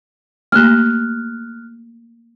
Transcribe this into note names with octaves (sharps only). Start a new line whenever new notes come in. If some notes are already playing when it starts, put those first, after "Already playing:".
A3 A#3 G4 F6 F#6